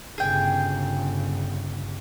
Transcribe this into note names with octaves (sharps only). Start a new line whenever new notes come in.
G1 C#3 G#4 G5